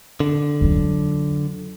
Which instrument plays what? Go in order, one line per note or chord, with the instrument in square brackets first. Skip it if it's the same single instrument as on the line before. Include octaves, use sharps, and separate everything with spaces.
[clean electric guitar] D3
[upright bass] F2 F#3